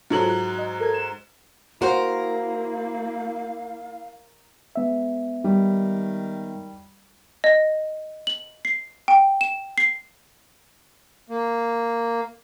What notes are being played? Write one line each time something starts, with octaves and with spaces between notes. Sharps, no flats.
G#2 F#3 F4 A4 C#5 F#7
F#6
D#5
A4 A#4 G#6
E7
A#3 E4 F#4 A#4 C5 F5
G#3 B3 E5
D#3 G3
D#5
F#7
C7
G5
E7
C7
A#3